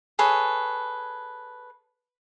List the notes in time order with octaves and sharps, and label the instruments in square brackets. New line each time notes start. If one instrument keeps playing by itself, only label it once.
[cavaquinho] G#4 A4 B4 C#5